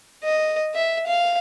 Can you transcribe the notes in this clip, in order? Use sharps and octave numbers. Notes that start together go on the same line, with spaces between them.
D#5
E5
F5